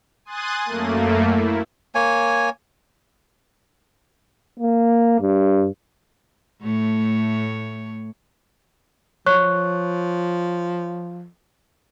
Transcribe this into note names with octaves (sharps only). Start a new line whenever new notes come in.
G#5 C6 D#6 F#6 A6 D#7
F#2 A3 A#3
E4
A#3 C#5 G#5
A#3
G2
A2 A3 C#5
F3 C#5 C#6 F#6